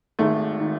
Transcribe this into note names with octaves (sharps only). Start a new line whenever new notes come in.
G#1 G#2 D#3 A3
D#3